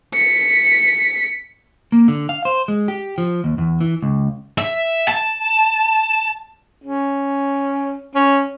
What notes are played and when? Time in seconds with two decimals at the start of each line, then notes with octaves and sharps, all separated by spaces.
0.14 B6 C#7
1.92 A#3
2.08 D3
2.29 F5
2.45 C5
2.68 G#3
2.88 G4
3.18 F3
3.44 D#2
3.58 E2
3.81 E3
4.02 C#2
4.58 E5
5.08 A5
6.82 C#4
8.15 C#4